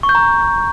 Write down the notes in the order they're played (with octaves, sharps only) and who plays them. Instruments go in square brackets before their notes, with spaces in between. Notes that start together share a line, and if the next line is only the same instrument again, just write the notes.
[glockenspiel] C#6
G6
A#5